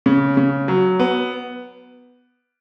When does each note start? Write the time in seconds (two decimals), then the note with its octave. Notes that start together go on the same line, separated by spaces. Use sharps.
0.06 C#3
0.37 C#3
0.68 F#3
0.99 B3